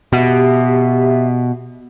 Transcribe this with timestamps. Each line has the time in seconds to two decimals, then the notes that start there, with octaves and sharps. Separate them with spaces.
0.13 B2 G4 E5